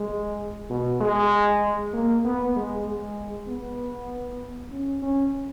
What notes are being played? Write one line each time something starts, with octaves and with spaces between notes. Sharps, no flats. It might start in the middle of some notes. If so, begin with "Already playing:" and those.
Already playing: G#3
B2
G#3
A#3
B3
G#3
G#3
B3
C#4
C#4